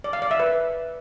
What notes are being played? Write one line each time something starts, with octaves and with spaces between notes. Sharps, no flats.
D5
F5
D5
E5
B4